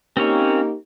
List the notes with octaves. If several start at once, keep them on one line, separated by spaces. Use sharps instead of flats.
A#3 C4 C#4 D#4 G4 C#5